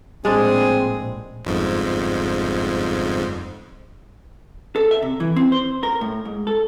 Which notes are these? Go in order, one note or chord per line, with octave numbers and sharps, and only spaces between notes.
A#1 A2 G#3 C4 D4 G#4
G1 F2 G#2
A4
E5
C3
E3
C4
C5
A#4
A2
G#2
A4